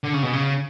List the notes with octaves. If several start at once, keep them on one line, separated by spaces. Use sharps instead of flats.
D3
C#3
B2
C#3